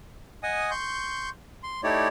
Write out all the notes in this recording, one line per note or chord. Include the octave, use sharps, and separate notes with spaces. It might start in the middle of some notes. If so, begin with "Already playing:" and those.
D#5 F#5 G#5 D#6
C6 C#6 G6
C6
A3 D#4 E4 G4 C#5 D5